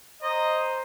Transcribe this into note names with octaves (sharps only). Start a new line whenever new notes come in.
C5 D#5 A#5